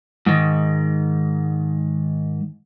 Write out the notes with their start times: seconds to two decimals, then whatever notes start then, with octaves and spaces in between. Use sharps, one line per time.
0.26 G#2 D#3